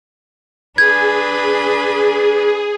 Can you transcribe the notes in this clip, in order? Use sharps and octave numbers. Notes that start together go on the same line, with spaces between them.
D4 G#4 B4 G#6